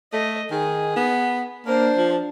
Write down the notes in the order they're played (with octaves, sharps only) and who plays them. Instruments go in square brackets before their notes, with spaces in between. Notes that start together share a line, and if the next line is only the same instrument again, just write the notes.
[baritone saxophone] A3 [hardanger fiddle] D#5
[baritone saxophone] D#3 [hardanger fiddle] G#4
[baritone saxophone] B3
[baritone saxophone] A#3 [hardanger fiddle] D4 C5
[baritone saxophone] F3